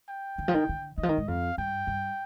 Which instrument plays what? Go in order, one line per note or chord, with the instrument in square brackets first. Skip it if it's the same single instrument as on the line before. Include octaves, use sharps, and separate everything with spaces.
[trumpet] G5
[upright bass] D3
F3
D#3
D3
[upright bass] D#3 [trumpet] D#5
[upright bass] F3
D#3
G#2
[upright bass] F2 [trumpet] F5
[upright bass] G2 [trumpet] G5
[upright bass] G2